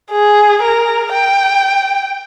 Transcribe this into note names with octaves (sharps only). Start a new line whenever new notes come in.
G#4
A#4
G5